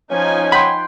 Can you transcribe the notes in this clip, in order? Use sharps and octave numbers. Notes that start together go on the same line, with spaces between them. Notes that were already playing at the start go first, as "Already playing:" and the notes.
F3 C#4 D#4 G#5
F#5 G5 B5 C6